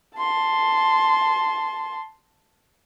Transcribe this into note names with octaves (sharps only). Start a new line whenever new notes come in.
A5 C6